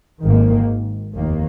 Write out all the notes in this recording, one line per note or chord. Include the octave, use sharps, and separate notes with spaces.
G#1 G#2 D#3 A#3
F1 D#2 D#3 A#3